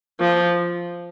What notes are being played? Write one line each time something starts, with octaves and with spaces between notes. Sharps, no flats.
F3